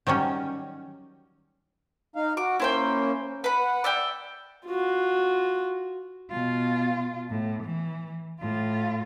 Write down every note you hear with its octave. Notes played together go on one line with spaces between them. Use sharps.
D#3 F#3 G3 C#4
D#4 F5
F#4 D6
A#3 C#4 E4 C5 G5
B4 F#5 B5
D5 E5 G5
F4 F#4
B2 F4
A2
E3
A2 F4